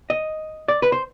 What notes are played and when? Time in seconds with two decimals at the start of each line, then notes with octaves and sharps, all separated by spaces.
0.10 D#5
0.68 D5
0.82 B4
0.92 C5